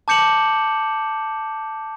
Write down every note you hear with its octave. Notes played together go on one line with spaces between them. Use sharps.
A5 D6 G6 C#7 E7 F#7